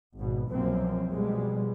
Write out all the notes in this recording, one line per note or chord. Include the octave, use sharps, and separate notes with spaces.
G#1 B2
C2 F#2 B2 F3 A#3 C4
B2 F3 G3 G#3